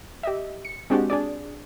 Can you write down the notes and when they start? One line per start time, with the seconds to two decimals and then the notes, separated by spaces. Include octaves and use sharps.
0.23 G4 D#5 E5
0.65 C#7
0.90 G#3 C4 D4 F#4 G4
1.10 D4 G#4 D5